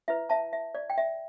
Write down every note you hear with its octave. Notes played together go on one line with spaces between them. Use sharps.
E4 B4 E5
E5 A5
E5
D5
G5
E5